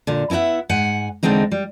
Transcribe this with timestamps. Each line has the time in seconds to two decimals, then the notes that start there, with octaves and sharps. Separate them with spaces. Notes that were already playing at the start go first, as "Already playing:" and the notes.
0.07 A#2 D3
0.30 B3 E4 G4 E5 F#5
0.69 G#2 F#5 G#5
1.23 E2 G#2 D3 G#3 C4 D#4
1.52 G3